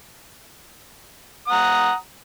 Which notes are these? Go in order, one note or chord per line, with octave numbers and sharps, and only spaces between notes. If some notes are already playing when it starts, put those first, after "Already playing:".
F#5 A#5 D#6